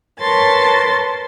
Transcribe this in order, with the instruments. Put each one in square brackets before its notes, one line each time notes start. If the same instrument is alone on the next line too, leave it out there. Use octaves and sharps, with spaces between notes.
[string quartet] A#4 B4 C#5 A5 C6 A6